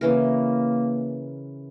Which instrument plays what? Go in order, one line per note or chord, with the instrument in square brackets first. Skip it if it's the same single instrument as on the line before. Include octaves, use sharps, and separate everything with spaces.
[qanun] C#3 E3 A#4 [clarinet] A#3